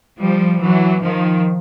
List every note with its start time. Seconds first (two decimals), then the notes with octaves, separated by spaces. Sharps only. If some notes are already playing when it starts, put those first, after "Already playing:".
0.19 F3 G3
0.60 E3 F#3
1.01 D#3 F3